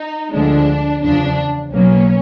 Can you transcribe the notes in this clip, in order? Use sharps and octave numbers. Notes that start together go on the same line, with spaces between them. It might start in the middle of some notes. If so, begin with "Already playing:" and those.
Already playing: D#4
D2 D3 F3 G#3 D4
E2 C#3 F3 D4
B1 B2 F#3 A#3 C#4